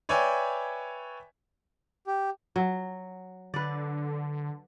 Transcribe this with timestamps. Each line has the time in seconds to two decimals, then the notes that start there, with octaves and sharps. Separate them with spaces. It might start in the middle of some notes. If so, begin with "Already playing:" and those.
0.09 B4 C#5 D5 E5 G5 G#5
2.07 G4
2.56 F#3
3.54 D3 B4 D5